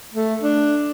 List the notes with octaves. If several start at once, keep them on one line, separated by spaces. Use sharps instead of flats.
A3
D4